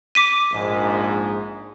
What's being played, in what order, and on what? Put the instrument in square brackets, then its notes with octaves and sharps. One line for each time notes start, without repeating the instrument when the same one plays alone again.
[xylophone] D6 B6 D#7
[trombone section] A#1 G#2